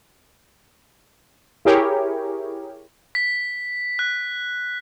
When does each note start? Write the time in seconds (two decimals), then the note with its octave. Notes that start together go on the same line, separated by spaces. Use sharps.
1.65 E4 G4 G#4 A#4 C#5
3.15 B6
3.99 F#6